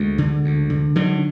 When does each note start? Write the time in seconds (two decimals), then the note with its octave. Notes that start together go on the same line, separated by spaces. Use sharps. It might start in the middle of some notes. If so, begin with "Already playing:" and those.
Already playing: D2 G#3
0.18 D3
0.44 D2
0.70 D3
0.95 D3 D#3 F#3